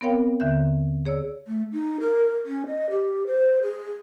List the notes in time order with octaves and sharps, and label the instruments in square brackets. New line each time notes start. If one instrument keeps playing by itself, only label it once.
[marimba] B3 C4 A#4 C#5 F5 G5
D#2 D3 E5 G6
G#4 C#5 D5 E6
[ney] A3
D#4
A#4
C#4
D#5
G4
C5
G#4